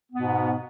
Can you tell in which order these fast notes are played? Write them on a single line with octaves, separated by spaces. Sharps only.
B3 G#2 B2